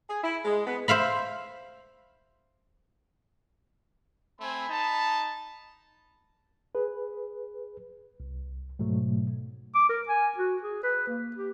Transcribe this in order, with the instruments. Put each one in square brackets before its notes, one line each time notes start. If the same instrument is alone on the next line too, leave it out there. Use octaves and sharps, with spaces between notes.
[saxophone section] G#4
E4
G#3
B3
[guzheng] C5 E5 F5 B5
[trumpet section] A3 C4 G#5 [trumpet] B5
[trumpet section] D#4 A5
[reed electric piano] G#4 B4
C2
G#2 B2 F#3 A3
[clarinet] D6
A#4
G#5
F#4
G#4
B4
A#3
G4